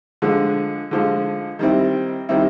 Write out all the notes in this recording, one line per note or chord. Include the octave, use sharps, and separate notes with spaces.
D3 F3 G#3
D3 F3 G#3
D#3 G3 C4 E4
D#3 G3 C4 E4